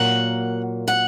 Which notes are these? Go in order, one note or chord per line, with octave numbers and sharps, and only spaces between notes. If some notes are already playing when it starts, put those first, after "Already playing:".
Already playing: A#2 F#3 A#3 F#5
F#5